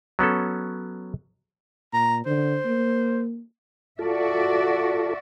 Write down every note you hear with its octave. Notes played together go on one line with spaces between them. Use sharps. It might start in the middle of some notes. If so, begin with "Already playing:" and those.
F#3 B3 C#4 A4
A#2 A#5
D3 C5
A#3
F4 F#4 A4 D5 E5